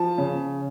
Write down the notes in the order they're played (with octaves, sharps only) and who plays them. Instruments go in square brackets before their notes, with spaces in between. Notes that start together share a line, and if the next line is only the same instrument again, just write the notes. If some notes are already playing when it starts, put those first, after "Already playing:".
Already playing: [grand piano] F3 A5
C#3